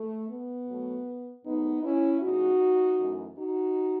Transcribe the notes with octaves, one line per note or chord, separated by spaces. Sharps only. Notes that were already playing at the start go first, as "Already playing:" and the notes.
Already playing: A3
B3
B2 F#3 A3
G#2 F#3 A3 B3 D#4
C#4 E4
E2 C#3 G#3 D#4 F#4
F#2 E3 A3
D#4 F#4